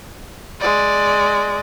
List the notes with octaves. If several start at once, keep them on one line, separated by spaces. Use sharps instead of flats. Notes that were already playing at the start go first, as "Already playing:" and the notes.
G#3 D5